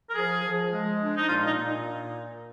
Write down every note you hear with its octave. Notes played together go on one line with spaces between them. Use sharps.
A#4
F3 G#4
F3
G#3
D4
D#4
A#2 F4
D#4
A#2